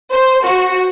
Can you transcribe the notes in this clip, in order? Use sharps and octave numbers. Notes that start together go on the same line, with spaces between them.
C5
F#4